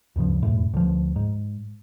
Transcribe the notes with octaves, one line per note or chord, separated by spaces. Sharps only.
D2 G2 C#3 F3
E1 F2 A2
D2 F3
G#2